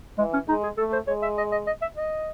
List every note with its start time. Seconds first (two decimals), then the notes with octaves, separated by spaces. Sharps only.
0.18 E3 G#3
0.33 C#4
0.48 G#3 D#4
0.63 G#4
0.77 A3 A4
0.92 C5
1.07 G#3 C#5
1.22 E5
1.37 D#5
1.52 D#5
1.67 D#5
1.82 E5
1.96 D#5